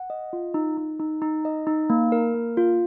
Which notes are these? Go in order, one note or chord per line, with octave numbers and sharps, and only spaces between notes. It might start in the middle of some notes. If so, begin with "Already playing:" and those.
Already playing: F#5
D#5
F4
D#4
D#4
D#4
D#4
D#5
D#4
A#3
A#4
A#3
F4